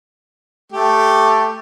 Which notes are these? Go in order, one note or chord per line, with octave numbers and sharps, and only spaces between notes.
A3 G4